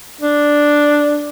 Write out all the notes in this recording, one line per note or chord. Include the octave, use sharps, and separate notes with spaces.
D4